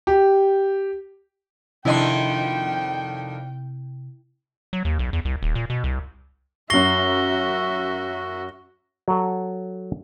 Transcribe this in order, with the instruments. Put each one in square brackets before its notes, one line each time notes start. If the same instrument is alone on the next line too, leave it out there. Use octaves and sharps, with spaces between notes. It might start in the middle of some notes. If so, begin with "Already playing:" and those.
[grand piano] G4
[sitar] F2 D#3 D4 [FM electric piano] C3 [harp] E4 D#5 C6 [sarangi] G5
[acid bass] F#3
D#2
B1
E2
C2
D#1
A#2
B2
C2
[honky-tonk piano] F#2 C7 [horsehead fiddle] F#4 E5 [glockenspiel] C#6 A#6 G7
[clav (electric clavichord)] F#3 A4